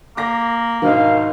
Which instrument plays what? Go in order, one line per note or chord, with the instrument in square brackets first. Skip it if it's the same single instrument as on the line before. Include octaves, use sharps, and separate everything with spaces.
[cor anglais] A#3 [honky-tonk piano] D6 A#6
[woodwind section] G#2 B2 G#3 [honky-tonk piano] D#3 D#4 [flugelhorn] F5